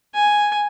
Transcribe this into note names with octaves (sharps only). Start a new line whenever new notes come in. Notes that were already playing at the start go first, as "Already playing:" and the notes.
G#5